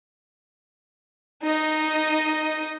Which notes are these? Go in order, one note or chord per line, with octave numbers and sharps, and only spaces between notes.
D#4 D#5